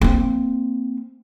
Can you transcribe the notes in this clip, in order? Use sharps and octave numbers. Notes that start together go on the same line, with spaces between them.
A#3 C4